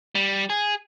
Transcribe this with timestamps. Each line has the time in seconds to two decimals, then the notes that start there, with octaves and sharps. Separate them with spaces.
0.15 G3
0.50 G#4